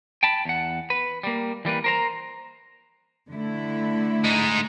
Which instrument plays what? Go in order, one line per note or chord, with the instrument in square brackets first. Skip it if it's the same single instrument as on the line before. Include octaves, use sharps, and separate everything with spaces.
[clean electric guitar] G5 A5 B5
E2 F#5
B4
G3 A#3
E3 G3 A#3 B4
A#4 C5 A#5
[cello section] D3 A3 E4
[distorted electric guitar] G#3 D#4